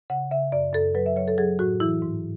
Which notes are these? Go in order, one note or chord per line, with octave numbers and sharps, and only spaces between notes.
C#3 F#5
C#3 E5
F#2 D5
F#2 A4
F#3 B4
E5
F#3 C#5
A4
F#3 G#4
A2 F#4
E3 E4
G#2